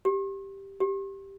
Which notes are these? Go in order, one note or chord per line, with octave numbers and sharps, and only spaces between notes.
G4
G4